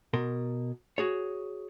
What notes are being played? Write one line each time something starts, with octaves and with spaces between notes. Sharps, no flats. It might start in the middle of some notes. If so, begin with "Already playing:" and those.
B2 A#4 C6
F#4 G#4 C#5